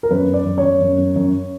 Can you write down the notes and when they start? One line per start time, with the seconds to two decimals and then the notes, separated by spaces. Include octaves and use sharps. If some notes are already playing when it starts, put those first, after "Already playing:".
0.03 A#4
0.11 F#2 B4
0.28 F#2
0.34 D5
0.45 F#2
0.58 C#5
0.63 F#2
0.81 F#2
0.98 F#2
1.16 F#2